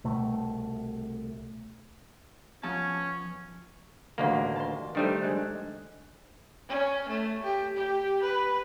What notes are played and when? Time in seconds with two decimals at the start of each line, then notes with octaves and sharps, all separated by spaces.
0.04 C2 B2 A3
2.63 F3 B3 C#4 A5
4.18 A1 D2 D#3 G#3 A#3
4.56 A5 C6
4.95 D#3 G3 A3 D4 D#4 C5
5.22 G#3 F#6
6.69 C#4
7.09 A3
7.43 G4
7.76 G4
8.23 B4